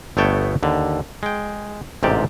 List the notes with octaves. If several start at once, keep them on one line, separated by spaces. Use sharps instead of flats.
G1 A3 B3 C#5 G5 A5
D#2 D3
G#3 G5
A1 G#2 C3 G4 D5